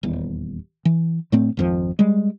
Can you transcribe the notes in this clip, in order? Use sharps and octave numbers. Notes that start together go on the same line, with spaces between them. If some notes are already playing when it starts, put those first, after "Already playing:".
D#1 E2
E3
A2 A3 C4
G#1 F2 F3
G3 G#3